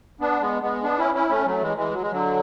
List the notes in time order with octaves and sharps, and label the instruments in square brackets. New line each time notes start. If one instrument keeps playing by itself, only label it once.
[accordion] B3 D4
G#3 B3
G#3 B3
B3 D4
C#4 E4
C#4 E4
A3 C#4
F#3 A3
E3 G#3
E3 G#3
F#3
G#3
D3 F#3